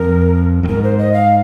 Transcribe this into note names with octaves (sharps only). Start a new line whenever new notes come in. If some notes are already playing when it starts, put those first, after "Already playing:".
Already playing: F2 A#4
F2
G#2 A#4
C5
D#5
F5